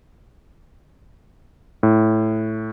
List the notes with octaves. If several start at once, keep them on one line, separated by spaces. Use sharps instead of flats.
A2